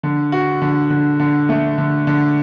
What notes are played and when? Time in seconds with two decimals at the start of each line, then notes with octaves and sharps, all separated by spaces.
0.03 D3
0.32 F#4
0.62 D3
0.90 D3
1.19 D3
1.49 A3
1.78 D3
2.07 D3